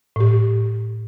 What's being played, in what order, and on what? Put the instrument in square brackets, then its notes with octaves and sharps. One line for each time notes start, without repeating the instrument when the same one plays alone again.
[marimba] A2 G4